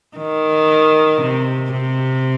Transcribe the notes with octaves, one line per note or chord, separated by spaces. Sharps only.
D#3
C3
C3